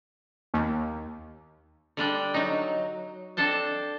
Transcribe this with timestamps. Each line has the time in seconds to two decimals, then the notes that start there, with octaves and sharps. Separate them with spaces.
0.54 D#2
1.97 D3 G3 D4 G5
2.34 F#3 D#4
3.37 C4 D4 A4 C5 A5